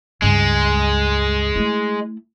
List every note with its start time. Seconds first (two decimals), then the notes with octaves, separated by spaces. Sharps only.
0.22 C#2 G2 G#3
1.55 A3 E4